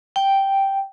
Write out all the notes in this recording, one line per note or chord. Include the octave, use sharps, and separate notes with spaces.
G5